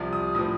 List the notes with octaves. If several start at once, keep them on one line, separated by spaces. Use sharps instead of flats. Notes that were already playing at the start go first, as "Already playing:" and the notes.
Already playing: C2 C3 F3
D#6
A2 F3 D#6